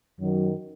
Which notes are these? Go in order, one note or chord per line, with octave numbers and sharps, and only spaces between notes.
F#2 D#3 F#3